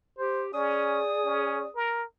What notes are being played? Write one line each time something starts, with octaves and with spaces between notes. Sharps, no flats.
G4 C5
C#4 G#4 D5 D#6
C#4
A#4